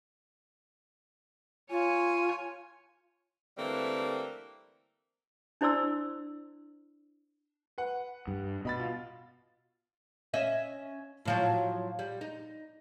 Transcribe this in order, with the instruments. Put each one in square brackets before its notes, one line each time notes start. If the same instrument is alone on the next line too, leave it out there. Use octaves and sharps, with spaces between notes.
[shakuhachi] F4 [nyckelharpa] C#5 G#5
[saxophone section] D3 E3 G3 A3 A#3 C4
[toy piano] D4 E4 C5 D5 C6 E6
[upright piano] B4 F#5
[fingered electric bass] G2
[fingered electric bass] B2 [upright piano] D#5 B5 A6
[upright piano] F4
[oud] C#4 D#5 E5
A2 F3 F#3
G3
D#4